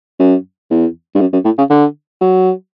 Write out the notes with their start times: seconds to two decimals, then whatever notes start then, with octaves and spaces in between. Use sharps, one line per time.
0.20 F#2
0.71 E2
1.15 G2
1.21 F#2
1.33 F#2
1.45 A2
1.58 C#3
1.70 D3
2.21 F#3